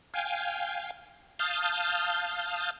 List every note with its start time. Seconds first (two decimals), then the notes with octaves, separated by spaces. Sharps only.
0.14 F5 G5 G#5
1.39 F5 A5 D#6 F6 G6